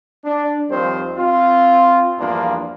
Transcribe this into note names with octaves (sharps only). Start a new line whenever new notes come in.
D4
D#2 D#3 F3 G3 C4 C5
C4 F4
E2 G2 F3 A#3 D4 F4